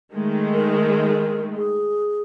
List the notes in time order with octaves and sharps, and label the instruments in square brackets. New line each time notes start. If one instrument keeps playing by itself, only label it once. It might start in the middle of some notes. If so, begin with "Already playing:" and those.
[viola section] D#3 G#3 A3
[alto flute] A#4
G#4